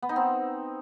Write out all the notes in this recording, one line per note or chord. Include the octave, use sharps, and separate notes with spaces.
B3
D#4
C4